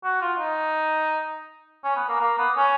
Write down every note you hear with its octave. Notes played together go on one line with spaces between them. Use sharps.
F#4
F4
D#4
C#4
B3
A#3
A#3
B3
C#4